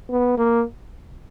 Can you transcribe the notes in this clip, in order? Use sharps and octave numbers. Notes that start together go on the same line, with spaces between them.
B3
A#3